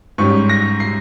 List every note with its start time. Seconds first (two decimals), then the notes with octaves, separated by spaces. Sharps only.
0.18 G#2 G3 C#4 C#6
0.49 A#6
0.80 C7